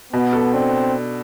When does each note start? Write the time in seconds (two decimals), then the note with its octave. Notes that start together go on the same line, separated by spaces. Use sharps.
0.13 B2 B3
0.33 A4
0.53 C4 D4